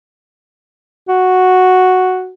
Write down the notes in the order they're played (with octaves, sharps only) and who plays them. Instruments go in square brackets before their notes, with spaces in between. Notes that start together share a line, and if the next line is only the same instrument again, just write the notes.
[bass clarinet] F#4